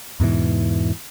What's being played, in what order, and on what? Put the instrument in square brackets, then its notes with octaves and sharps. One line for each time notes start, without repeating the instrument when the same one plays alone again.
[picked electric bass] E2 G#2 B2 E3